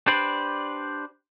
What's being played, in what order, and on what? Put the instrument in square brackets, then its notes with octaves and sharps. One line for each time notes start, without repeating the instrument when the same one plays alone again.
[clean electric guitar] D4 G4 B4 C5 D5